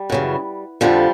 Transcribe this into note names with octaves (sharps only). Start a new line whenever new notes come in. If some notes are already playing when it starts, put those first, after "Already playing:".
Already playing: G3
F#2 C#3 E3
F2 D3 F3 G3